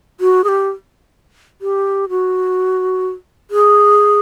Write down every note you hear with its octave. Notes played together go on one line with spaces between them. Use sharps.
F#4
G#4
G4
G4
F#4
G#4